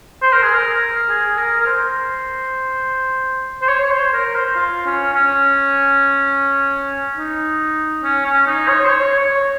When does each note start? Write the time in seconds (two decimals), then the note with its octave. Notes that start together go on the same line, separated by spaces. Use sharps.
0.22 C5
0.33 A#4
0.42 G#4
0.53 A#4
1.09 G#4
1.38 A#4
1.61 A#4
1.67 C5
3.62 C5
3.69 C#5
3.84 C#5
3.91 C5
4.13 A#4
4.35 C5
4.56 F4
4.86 C#4
5.13 C#4
7.17 D#4
8.03 C#4
8.25 C#4
8.47 D#4
8.69 C#5
8.85 C5
8.90 C#5
9.19 C#5